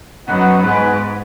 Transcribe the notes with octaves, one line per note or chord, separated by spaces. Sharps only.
F#2 B3 D#4 B4 F#5
G#2 G#3 B3 D#4 G#4 B4